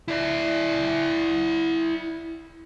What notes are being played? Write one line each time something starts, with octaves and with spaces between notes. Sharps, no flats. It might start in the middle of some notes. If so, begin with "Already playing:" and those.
E4 D5